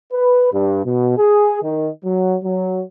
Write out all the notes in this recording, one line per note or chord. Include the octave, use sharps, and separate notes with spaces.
B4
G2
B2
G#4
D#3
F#3
F#3